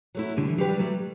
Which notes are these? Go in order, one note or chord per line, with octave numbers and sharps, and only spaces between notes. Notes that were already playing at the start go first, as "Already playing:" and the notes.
F#3 A3 E4
D3 G3
E3
F#3 D4 G4 B4
G3
F#3 G3 A3